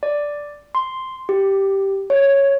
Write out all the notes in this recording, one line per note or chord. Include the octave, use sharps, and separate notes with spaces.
D5
C6
G4
C#5